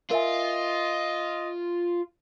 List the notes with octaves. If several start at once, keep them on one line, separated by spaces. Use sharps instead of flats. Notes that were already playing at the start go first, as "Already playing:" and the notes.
F4 A#4 D#5 E5 G#5